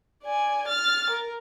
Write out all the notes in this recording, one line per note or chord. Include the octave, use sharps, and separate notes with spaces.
D5 G#5
F6 A6
A#4